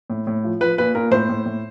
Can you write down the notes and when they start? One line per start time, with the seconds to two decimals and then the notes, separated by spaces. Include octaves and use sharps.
0.10 A2
0.27 A2
0.44 F3
0.60 F3 B4
0.78 A#2 B4
0.95 A#2 A#4
1.11 A2 C5
1.29 A2
1.46 A2